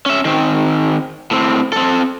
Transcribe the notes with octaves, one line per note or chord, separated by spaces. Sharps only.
C#4 E5
D#3 C4
A2 C4
C4 A4